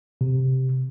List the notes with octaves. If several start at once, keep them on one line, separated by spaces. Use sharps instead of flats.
C3